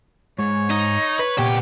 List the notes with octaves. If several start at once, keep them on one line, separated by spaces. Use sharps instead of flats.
G#2 C#5
D#4
B4
A#2 B3 G4